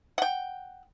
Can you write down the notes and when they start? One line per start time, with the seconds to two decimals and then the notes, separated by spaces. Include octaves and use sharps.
0.18 F#5 G5